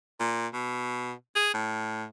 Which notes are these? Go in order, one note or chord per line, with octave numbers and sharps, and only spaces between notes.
A#2
B2
G#4
A2